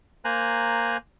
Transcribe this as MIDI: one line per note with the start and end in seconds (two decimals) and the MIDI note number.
0.25 0.97 58
0.25 0.97 72
0.25 0.97 80
0.25 0.97 82
0.25 0.97 90